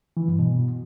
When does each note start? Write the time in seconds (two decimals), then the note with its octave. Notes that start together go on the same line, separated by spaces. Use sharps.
0.17 E3
0.28 G2
0.39 B2